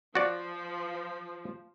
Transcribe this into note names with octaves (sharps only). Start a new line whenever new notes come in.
F3 F#4 D5